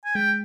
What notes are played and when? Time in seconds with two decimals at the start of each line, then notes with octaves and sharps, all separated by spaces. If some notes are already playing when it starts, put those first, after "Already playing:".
0.05 G#5
0.15 G#3 G5